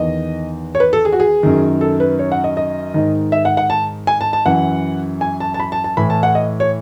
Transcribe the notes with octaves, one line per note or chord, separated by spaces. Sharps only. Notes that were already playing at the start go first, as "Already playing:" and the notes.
Already playing: E2 D#3 D#5
C#5
B4
A4
G#4
F#4
G#4
F#2 D#3
A4
B4
C#5
F#5
D#5
D#5
G#2 D#3
E5
F#5
F#5
A5
G#5
A5
A5
F#2 E3 F#5
G#5
A5
A5
B5
A5
A5
A2 E3 B5
A5
F#5
D#5
C#5